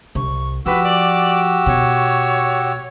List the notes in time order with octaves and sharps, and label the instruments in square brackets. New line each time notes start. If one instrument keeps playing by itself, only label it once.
[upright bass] C2 [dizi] C#6
[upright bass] F3 [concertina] F#4 G4 E6 [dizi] B4
[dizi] D5
[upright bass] B2 [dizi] C#5